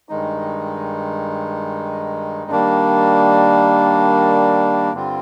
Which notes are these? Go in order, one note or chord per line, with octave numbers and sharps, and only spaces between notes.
G2 D#3 G#3 D#4
D#3 G3 A#3 D4
G2 D3 G3 C4 F4